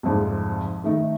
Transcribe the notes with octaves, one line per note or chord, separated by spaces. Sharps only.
C2 F2 G#2
D#3 A3 D#4